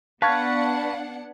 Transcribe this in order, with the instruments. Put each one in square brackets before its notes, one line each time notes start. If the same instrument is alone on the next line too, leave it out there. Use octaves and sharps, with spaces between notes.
[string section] B3 D4 F#5 [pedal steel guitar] B4 [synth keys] F5 [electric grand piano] A5 C#6 G#6